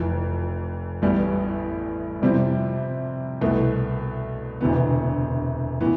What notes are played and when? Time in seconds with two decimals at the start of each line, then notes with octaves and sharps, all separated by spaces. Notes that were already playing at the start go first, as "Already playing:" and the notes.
Already playing: F1 F2 E3
1.02 A1 A2 G3 B3
2.22 F2 C3 G3 C4 E4
3.41 C2 B2 A3
4.61 E1 D2 C3 E3 B3
5.81 A2 E3 B3